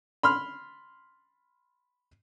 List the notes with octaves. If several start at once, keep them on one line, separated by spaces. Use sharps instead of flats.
B5 C6 F6